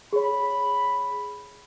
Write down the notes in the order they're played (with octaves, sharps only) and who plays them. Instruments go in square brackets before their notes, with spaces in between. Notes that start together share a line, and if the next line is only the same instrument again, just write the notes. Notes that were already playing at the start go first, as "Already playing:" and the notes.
[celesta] G#4 C#5 [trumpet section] B5